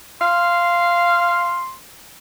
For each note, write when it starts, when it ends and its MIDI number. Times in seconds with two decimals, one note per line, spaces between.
0.21 1.63 77
0.21 1.75 84